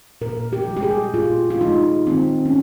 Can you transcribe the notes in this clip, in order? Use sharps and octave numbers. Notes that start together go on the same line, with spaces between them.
A#2 A#4
G4
F3 G#3
G4
G#4
A#2 F4
F4
F3 G#3 D#4
D#3 C4
C#4